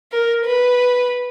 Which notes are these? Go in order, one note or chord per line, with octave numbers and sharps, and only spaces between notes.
A#4
B4